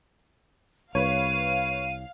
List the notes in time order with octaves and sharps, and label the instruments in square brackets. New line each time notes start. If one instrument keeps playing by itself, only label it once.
[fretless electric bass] C2 [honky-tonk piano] B4 C#5 [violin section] F5 [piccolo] D#7